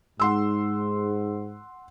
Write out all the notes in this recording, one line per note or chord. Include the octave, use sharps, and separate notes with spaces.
G#2 F#5 C6 E6